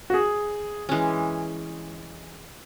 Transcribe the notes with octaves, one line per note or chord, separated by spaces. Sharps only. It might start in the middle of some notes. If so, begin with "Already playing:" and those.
F#4
G#4
E3 G#3 C#4